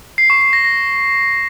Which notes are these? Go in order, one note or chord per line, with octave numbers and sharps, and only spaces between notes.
C7
C#6
C7
A#6
A#6